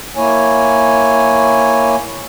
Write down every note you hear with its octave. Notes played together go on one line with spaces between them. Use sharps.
A#3 E4 C#5 G#5